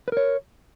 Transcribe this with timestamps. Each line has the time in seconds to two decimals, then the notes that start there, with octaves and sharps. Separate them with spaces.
0.08 B4
0.12 A#4
0.17 C#5